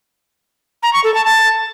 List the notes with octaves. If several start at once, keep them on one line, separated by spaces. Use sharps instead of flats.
A#5
C#6
A4
A5
A5